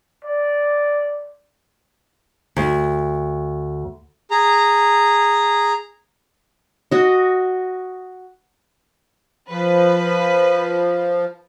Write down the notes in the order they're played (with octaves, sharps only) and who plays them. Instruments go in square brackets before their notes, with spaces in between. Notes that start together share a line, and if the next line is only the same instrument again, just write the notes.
[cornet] D5
[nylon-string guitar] D2
[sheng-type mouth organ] G#4 A#5
[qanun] F#4 D#5
[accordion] F3 [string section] B4